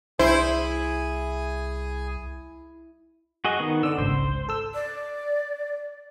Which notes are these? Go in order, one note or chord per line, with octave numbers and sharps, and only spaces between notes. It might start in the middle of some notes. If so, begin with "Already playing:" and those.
C2 E4 G#4 C5 G#5
F#4 G#4 D#5
D#3 B3
D3 D5 E6
G#1 C#2 C5
A4 E6
D5